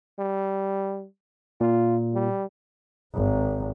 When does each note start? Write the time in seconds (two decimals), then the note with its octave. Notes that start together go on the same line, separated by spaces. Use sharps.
0.19 G3
1.61 A#2 F4
2.14 G3
3.14 G#1